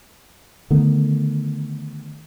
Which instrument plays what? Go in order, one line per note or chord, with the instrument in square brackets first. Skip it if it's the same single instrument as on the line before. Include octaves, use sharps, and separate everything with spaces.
[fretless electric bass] D3 D#3 A3 B3